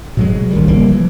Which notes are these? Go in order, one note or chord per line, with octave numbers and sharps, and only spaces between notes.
B2 F#3 G#3
A#1 D#3 G3
C#3 E3 G3 A#3
E3 F3